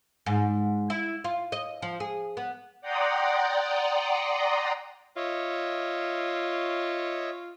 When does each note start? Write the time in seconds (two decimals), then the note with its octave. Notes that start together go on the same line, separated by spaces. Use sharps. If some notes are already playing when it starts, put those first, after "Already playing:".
0.26 G#2
0.90 E4
1.24 F4
1.52 D#5
1.82 F3
2.00 G#4
2.37 B3
2.81 D5 F#5 G5 A#5 C6 D#6
5.17 F4 C#5 D#5 E5